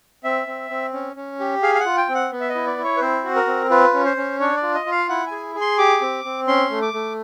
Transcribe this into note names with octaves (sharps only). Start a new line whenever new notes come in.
C4 E5
C4
C4
C#4
C#4
G4
G#4 F5
F5
F#5
F4
G5
C4
F#5
B3
E5
D#5
E4
D5
E4
C#5
B4
C4 C5
F#4
A#4
C4
F4 B4
C#4
C5
C#4
D4 C#5
D5
F4
D#5
F4
F5
E4 F#5
G#4 G#5
G#4
C6
G4 D6
C4
C4
C#4 C6
A3
D6
A3